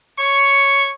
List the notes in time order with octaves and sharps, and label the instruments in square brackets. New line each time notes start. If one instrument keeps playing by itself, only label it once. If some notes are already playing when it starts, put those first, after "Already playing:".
[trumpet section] C#5 C#6